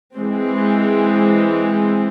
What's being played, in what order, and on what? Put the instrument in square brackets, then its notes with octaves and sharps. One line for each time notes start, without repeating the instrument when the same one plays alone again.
[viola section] E3 G#3 C4